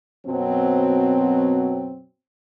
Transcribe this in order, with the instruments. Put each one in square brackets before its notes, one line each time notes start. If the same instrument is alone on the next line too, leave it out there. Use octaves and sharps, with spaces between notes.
[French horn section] F#2 B2 F#3 C4